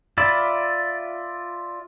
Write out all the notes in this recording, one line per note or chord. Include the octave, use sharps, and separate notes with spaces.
F4 D5 E5 B5